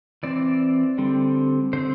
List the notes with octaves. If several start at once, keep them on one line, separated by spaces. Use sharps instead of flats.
E3 C4 D5
D3 G3 C4
D3 C4 C5